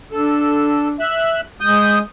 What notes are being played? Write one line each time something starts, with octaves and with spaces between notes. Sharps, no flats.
D4 A4
E5 F#6
G#3 D#6 G6